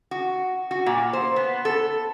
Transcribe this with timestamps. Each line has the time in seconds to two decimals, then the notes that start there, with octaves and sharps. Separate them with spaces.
0.11 F#4
0.71 F#4
0.86 A#2
1.13 C5
1.36 B3
1.65 A4